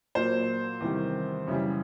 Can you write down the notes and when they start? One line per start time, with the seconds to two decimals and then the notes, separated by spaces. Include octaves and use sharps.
0.15 A#2 F#3 A#3 C5
0.81 E2 C3 D#3 G3
1.47 F#2 C#3 E3 G3